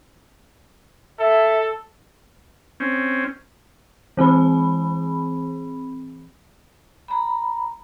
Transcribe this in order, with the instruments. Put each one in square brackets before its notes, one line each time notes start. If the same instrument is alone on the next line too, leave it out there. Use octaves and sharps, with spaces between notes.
[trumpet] A4 [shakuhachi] E5
[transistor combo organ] C4 C#4
[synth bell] E3 C4 G#4 B5
[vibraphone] A#5 B5